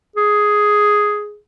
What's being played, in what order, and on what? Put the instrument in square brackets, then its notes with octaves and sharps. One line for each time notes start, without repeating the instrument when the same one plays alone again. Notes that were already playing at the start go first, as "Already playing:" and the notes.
[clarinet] G#4